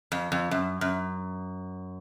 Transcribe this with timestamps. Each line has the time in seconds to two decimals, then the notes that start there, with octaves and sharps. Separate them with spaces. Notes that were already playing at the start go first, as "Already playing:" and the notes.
0.12 F2
0.32 F2
0.51 F#2
0.81 F#2